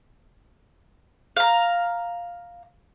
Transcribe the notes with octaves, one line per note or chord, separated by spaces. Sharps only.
F5 A#5